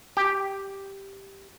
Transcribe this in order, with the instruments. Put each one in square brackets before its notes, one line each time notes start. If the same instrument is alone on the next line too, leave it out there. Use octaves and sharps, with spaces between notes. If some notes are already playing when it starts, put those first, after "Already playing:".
[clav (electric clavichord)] G4